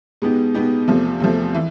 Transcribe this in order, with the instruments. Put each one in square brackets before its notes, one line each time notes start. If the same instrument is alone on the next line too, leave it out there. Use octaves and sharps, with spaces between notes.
[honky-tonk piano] B2 G#3 B3 D#4 G4
B2 G#3 B3 D#4 G4
E2 C3 F3 A3
E2 C3 F3 A3
E3